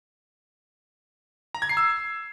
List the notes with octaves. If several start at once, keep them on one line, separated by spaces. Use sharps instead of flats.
A#5
G#6
C7
E6